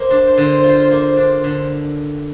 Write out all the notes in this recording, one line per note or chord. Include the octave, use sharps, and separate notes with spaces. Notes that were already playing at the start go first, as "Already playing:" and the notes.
Already playing: A#3 C5
D4
D3
F4
A#3
D4
D3